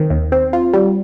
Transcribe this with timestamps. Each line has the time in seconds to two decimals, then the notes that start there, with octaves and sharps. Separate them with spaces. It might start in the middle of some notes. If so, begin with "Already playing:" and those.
Already playing: D#3 C4
0.10 D#2
0.32 C4
0.53 F4
0.73 G3